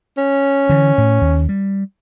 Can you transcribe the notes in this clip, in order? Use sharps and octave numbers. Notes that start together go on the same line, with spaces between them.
C#4
D3 E3
A2
D#2
G3